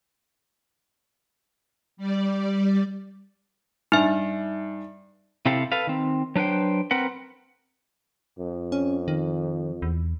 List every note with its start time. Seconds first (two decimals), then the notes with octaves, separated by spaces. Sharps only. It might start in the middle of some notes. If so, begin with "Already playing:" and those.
1.97 G3 D5
3.92 G2 D#4 E5
5.46 C3 C4 E4 G4 A4 F5
5.72 A4 B4 F5
5.87 D#3 C4
6.36 F#3 D4 B4 C5 G5
6.91 C4 A#4 B4 F#5
8.39 F2
8.72 C#4
9.08 D#3
9.82 E2